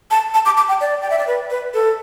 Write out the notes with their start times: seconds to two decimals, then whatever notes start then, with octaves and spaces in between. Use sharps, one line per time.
0.11 A5
0.34 A5
0.46 D6
0.57 D6
0.69 G5
0.81 D5
1.02 G5
1.10 E5
1.19 D5
1.27 B4
1.50 B4
1.74 A4